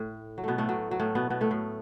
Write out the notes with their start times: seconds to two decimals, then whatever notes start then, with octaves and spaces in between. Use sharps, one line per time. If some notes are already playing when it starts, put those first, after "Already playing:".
Already playing: A2
0.38 F#3
0.44 B2 A3 B3
0.58 A2 A3
0.69 F#3
0.91 F#3
1.00 A2 A3
1.15 B2 B3
1.30 B2 B3
1.41 A2 A3
1.51 A2